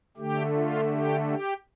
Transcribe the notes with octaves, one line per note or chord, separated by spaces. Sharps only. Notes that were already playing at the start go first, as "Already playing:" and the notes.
D3 A3 G4
F4
G4
G4